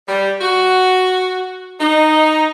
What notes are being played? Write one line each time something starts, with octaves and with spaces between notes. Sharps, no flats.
G3
F#4
D#4